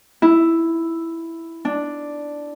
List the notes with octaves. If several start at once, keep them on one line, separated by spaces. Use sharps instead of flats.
E4
D4